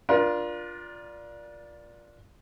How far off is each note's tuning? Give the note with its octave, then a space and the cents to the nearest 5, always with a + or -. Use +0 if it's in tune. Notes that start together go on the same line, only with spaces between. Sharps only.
D4 +0 F4 +0 A#4 +35